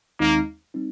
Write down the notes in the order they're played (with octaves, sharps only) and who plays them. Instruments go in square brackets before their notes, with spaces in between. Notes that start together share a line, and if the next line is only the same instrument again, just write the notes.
[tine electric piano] D#2 D#3 G#3 C4 D#4 [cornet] A#3
[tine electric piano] G3 C4 D#4